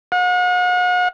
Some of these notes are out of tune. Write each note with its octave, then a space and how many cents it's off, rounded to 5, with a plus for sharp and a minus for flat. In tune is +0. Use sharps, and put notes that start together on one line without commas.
F#5 -40